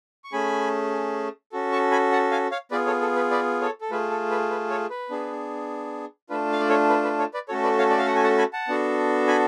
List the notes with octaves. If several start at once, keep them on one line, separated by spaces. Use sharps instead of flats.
C#6
A3 C#4 G#4 G#5 B5
C#4 F#4 A4
A5 C#6
G#5 B5
F#5 A5
F5 G#5
C#5 F5
B3 F4 G#4 B4 D5
A4 C#5
A4
B4
B4 D5
A4 C#5
A4
A3 F4 G#4 B4
A4
B4
B4
A4 C#5
B4
B3 D4 G#4
A3 D4 F4 B4
F5
D5
A4 C#5
B4
B4
A4 C#5
B4 D5
A3 C#4 F#4 A4 C#5
B4 D5
C#5 F5
D5
F5
F#5
G#5
F#5 A5
G#5 B5
F#5 A5
B3 D4 F#4 A4
G#5 B5